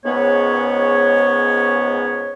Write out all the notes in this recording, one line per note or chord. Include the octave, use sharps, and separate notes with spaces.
C#2 G#2 B3 C#5